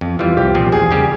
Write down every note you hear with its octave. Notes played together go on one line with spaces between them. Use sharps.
F2
E3 G3 F4
C2 G4
A#2 F3 C4
E2 G#4
C#3 G3 C#4 G4